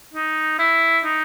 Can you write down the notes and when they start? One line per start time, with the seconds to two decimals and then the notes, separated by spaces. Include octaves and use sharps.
0.14 D#4
0.59 E4
1.05 D#4